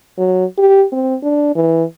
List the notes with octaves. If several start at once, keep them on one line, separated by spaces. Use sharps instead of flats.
F#3
G4
C4
D4
E3